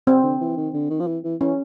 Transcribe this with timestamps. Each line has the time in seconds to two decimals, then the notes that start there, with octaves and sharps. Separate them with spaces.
0.07 C3 C4
0.23 D3
0.40 E3
0.57 D#3
0.74 D3
0.90 D#3
1.00 F3
1.07 E3
1.24 E3
1.41 E3 C#4